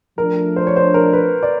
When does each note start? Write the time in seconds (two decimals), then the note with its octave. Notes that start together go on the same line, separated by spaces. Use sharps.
0.18 F3 A3 D4 A#4
0.56 C5
0.67 C#5
0.76 C5
0.94 A#4
1.13 B4
1.43 D5